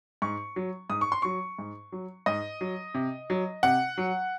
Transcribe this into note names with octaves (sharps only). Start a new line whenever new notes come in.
G#2 C#6
F#3
G#2 D#6
C#6
C6
F#3 C#6
G#2
F#3
G#2 D#5
F#3
C3
F#3
C3 F#5
F#3